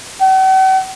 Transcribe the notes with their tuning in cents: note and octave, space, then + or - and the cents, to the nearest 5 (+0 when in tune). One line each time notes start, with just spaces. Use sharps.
F#5 +45